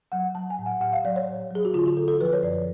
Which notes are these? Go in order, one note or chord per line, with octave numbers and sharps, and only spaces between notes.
F#3 F#5
F#3 A5
G#5
A2
F#5
A2 F#5
F5
F#3 D5
C#5
A2
F#3 G#4
F#4
D3 F4
F#4
D3 A4
A4
F3 B4
C#5
F#2 D5